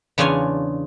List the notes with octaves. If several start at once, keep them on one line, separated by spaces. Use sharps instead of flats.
E2 C#3 D4 F4 C#5 G#5